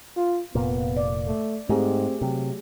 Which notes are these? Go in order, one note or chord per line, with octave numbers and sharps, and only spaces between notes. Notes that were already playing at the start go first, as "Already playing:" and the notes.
F4
F1 A#2 A#3 B3
D5
A3
G#2 A3 C4 G4 G#4
C3 F#3